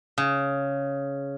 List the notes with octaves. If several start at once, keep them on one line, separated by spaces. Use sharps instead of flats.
C#3